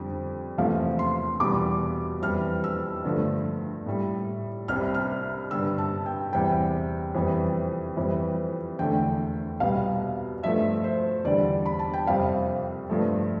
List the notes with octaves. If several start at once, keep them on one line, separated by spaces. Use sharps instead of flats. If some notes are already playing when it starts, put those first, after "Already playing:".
Already playing: F2 D3 G3
E2 C3 F3 A3 F5
C6
E2 B2 G3 D6
F2 E3 G3 F6
E6
G2 D3 F3 A3
A2 G3
C2 C3 G3 F6
F6
G2 D3 G3 E6
A5
G5
E2 C3 G3 G5
F2 E3 G3
F2 E3 G3
E2 D3 A3 G5
C2 B2 G3 F5
G2 F3 A3 E5
C5
E2 D3 G3 D5
B5
A5
G5
F2 C3 G3 F5
G2 F3 A3